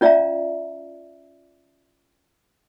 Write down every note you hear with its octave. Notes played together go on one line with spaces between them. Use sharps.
C#4 F4 D5 E5 F5 A#5